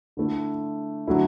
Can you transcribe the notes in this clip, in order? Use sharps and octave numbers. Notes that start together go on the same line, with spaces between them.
D3 A3 E4
D3 F#3 A3 E4